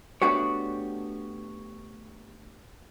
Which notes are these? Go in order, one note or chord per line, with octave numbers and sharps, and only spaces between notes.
A3 B3 D4 F#4 G4 C#5